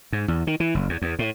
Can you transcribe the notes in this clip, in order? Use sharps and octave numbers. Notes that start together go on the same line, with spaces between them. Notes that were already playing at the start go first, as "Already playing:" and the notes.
G#2
E2
D#3
E3
F#1
E2
E2
A2